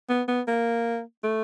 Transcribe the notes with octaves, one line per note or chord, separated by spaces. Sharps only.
B3
B3
A#3
A3